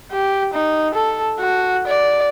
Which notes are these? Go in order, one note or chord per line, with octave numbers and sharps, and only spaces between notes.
G4
D#4
A4
F#4
D5